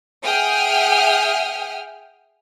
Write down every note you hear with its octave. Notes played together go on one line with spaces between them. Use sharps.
G#4 E5 F#5 G5 D#6 F6